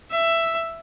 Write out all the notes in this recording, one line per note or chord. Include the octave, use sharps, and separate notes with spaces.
E5